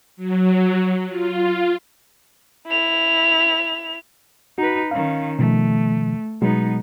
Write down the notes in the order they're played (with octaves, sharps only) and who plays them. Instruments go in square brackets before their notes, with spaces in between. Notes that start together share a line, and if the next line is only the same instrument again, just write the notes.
[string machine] F#3
F4
[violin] E4 F7
[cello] D#4 B4 [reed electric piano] F#4
[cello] D#3 C#4 [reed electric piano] F5
[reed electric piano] B2 D#3 F3 [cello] A3
[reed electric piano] B2 F#3 G#3 [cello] B3 D#4